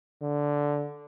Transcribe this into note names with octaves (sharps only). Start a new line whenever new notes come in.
D3